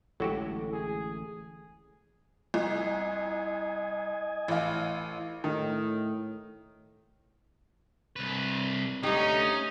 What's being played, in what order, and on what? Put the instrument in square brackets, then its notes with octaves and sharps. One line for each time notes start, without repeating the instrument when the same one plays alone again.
[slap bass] A1 D3 [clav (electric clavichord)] F#3 F#4 G4 [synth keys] G#3 E4 A4
[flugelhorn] G#4
[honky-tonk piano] C2 [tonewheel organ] D#5 G#5
[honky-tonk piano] A1 F5
[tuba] A2 [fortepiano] D#3
[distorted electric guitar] C2 B4
[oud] D2 G4 [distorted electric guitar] C#4 [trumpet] D#4